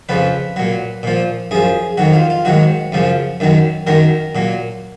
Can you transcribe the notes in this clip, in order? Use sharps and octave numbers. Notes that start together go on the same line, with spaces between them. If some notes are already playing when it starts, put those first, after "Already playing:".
F2 C#3 F3 B4
A#2 F#3
A#2 F3
F#2 F3 G#4
F2 D#3 F#3 F#4
F4
F4
G#2 D#3 F#3 F#4
F#2 C#3 F3
F#2 D#3 F#3
F#2 D#3 F#3 A#4
A#2 F#3